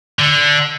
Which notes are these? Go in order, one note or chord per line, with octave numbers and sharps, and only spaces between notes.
D3